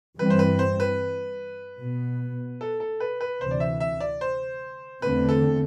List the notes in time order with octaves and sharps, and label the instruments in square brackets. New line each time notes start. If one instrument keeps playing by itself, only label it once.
[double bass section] G2 E3 G3 C4 [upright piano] B4
[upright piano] C5
B4
C5
B4
[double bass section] B2 B3
[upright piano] A4
A4
B4
B4
[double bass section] D2 C3 E3 [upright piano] C5
[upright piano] D5
E5
E5
D5
C5
[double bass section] E2 D3 A3 C4 [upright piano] B4
[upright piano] A4